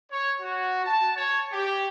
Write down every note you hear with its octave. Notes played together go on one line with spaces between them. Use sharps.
C#5
F#4
A5
C#5
G4